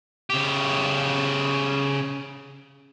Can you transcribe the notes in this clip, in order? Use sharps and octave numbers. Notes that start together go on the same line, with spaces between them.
C#3 G4